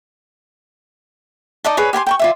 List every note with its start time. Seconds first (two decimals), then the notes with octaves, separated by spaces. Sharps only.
1.64 D#4 D5 D#5 A5
1.77 G#4 B4 C#5
1.93 G4 G#5 B5 C6
2.07 G5 A#5 C#6
2.19 F4 D5 E5